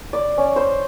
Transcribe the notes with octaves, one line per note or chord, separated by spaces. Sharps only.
D5
C#4
C5